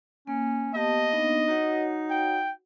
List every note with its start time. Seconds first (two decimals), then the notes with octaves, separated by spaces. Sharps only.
0.27 A#3 C#4
0.74 A#3 B3 G4 D#5 A5
1.13 B3 D4 D#4
1.48 D#4 F#4 C#5 F#5
2.10 G5